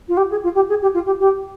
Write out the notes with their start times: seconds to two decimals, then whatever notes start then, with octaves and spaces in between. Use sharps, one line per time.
0.08 F4
0.17 G4
0.31 G#4
0.43 F4
0.55 G4
0.69 G#4
0.82 G4
0.94 F4
1.06 G4
1.20 G4